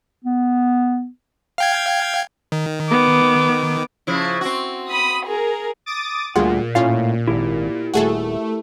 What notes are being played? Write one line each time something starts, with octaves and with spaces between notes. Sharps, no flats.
B3
F5 G5 G#6
D#3
B3 D6
C#3 F3 E4
C4 F#4
B5 D#6
G#4 A#4
D6 D#6 A6
D2 A#2 G3 F4 F#4 G#4 F#5
A2 C#4 F4 F5 A6
G#1 E4 G4 A#4
D#1 A3 F#4 G#4 A4